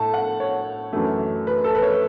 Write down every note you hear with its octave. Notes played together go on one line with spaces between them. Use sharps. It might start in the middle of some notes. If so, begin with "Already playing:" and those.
Already playing: A2 A3 A5
F#5
C#5
F#2 E3 A3
B4
A4
B4
C#5